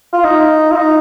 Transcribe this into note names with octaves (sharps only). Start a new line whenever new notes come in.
F4
D#4
F4
D#4